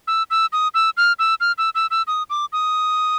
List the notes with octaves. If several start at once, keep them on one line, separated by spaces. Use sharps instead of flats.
E6
E6
D#6
E6
F6
E6
F6
E6
E6
E6
D#6
D6
D#6